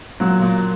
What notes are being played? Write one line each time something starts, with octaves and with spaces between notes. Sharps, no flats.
A#2 F#3
A#2